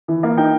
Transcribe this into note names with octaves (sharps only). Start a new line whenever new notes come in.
E3
A#3
D#4 G5